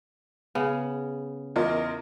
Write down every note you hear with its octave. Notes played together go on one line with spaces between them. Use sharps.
C#3 B3
E2 F4 A#4 D#5